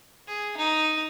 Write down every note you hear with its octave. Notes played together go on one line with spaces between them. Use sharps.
G#4
D#4